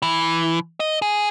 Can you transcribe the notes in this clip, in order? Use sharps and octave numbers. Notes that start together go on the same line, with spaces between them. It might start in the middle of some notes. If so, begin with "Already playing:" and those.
E3
D#5
G#4